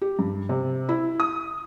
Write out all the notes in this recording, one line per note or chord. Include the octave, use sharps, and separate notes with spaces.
G4
G2
C3
E4
D#6